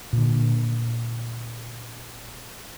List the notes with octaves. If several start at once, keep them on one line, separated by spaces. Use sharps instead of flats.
A#2 D3